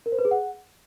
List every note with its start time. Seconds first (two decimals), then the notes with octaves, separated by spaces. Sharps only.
0.06 A#4
0.12 C5
0.19 B4
0.25 G#4
0.31 F#5